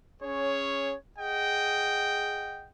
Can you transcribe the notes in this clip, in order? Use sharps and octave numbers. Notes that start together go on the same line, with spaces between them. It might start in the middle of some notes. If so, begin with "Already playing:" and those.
C#4 G#4 C#5
G#4 D#5 F#5 G5